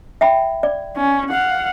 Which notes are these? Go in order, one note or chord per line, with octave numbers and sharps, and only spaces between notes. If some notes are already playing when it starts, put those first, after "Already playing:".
E5 G5 B5
D5
C#4
F5 F#5